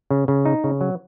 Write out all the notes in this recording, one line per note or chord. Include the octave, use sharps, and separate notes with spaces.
C#3
C#3
D#4
C#3
F#3